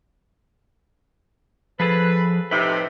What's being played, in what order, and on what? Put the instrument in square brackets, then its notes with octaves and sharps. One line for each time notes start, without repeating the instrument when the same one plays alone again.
[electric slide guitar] F3 G#4 A4 [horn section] B4
[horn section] A2 C3 [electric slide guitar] D#4 B4